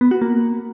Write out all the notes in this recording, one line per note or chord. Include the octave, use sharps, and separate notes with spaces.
B3
F#4
A#3